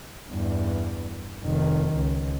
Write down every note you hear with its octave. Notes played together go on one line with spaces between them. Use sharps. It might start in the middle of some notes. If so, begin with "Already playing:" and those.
E2 G2
F1 D#3
C#2